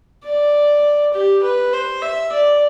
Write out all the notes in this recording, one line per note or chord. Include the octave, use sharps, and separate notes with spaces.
D5
G4
B4
C5
E5
D5